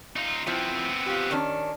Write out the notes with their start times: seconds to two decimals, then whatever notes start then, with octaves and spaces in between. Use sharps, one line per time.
0.16 D#4 F4
0.47 F3 B3 C4 E4
1.06 F4 G4
1.31 D#3 C#4 D4